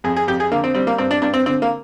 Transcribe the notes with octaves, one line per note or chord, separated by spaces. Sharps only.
F2 G#4
G#4
F2 G4
G#4
D3 A#3
C4
G3 C4
A#3
G2 C4
D4
G2 D4
C4
D3 C4
A#3